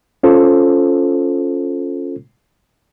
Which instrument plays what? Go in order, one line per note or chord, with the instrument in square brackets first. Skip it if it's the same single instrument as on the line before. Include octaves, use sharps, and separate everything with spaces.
[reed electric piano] C#4 F4 A4 C5